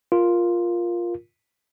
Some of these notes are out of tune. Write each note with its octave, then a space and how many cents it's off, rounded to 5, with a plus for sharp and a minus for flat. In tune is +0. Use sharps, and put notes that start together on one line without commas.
F4 +0 A#4 +10